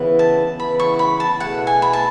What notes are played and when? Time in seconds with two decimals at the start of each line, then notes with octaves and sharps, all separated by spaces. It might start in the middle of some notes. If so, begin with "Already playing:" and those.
Already playing: C#3 E3 B3 E4 B4
0.19 A5
0.59 C#3 E3 B3 E4 B4 B5
0.80 C#6
0.99 B5
1.20 A5
1.39 B2 A3 E4 G#4 F#5
1.67 G#5
1.82 B5
1.93 A5